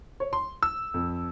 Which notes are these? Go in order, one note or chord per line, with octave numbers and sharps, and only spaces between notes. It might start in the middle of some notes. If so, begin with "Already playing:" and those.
C#5
C6
E6
F2